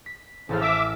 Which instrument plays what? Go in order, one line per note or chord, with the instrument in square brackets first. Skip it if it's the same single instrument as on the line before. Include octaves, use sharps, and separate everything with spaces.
[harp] B6
[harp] A1 A4 F6 [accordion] E2 C#3 F3
[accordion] E5 D6 E6